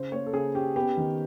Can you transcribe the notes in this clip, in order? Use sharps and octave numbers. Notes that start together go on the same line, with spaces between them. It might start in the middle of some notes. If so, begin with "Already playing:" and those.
Already playing: C#3 C5
A#3 C#5
A4
C#3 G#4
C#4 G4
B3 G4
D#3